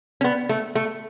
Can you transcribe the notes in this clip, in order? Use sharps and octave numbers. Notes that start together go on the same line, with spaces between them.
C#4
B3
A3
A3